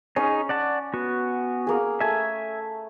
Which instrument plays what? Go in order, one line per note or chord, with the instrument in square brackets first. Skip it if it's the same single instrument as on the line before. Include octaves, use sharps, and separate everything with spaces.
[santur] C#4 [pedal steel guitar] D#4 G#4
[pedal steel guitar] D5 F#5 A5
B3 F#4
[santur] A#3 G#4
[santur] A3 [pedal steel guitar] E5 G#5